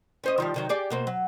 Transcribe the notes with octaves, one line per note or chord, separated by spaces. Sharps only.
C#4 C5 D#5
D#3 F3 G3
C3 D#3 F#3
G4 G#4 D5
B2 A#3 C4
F#3